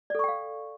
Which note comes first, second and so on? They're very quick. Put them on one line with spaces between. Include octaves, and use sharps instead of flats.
D5 A4 C#6 G5 F5